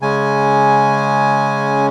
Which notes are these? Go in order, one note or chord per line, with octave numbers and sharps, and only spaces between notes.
C#3 G#3 C#4 G#5